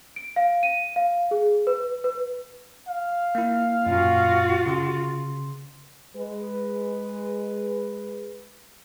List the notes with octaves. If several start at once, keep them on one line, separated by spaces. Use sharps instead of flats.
D7
F5
D#7
F5
G#4
B4
B4
F5
A#3 E4
F#2 A#2 F4 F#4
C#3 C6
G#3 B4